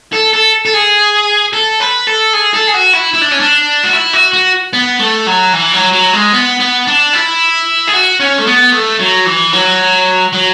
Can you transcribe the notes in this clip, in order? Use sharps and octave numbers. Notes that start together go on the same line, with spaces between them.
A4
A4
A4
G#4
A4
B4
A4
G#4
A4
G#4
F#4
E4
E4
D4
C#4
D4
F#4
E4
F#4
F#4
B3
A3
F#3
E3
F#3
F#3
G#3
B3
B3
D4
E4
G#4
F#4
C#4
A3
B3
A3
F#3
E3
F#3
F#3